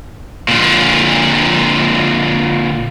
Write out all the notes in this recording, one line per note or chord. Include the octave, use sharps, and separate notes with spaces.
A#2 D3